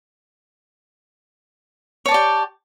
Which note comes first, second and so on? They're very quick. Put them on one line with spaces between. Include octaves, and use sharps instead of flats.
C#5 A5 D5 G4